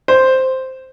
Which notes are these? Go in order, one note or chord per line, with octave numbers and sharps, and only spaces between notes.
C5